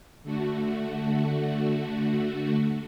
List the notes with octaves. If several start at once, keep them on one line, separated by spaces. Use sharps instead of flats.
D3 A3 F#4